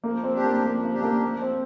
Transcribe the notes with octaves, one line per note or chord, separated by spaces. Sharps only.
F3 A#3
C4
D4 G4
A#3
F3 A#3
A#3
D4 G4
A#3
F3
C4